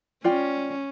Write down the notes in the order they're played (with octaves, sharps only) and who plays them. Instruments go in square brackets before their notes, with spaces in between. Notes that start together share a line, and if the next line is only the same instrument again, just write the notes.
[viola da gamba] C#4 [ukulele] F4 D5 G5